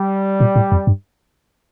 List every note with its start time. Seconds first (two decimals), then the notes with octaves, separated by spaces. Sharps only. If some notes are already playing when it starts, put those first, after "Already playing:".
Already playing: G3
0.40 A#2
0.56 A2
0.72 F2
0.87 G2